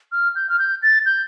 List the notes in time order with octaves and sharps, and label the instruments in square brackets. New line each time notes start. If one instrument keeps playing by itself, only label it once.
[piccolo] F6
G6
F6
G6
A6
G6